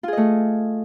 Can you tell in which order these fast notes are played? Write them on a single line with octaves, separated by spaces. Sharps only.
F4 G#4 D#5 A3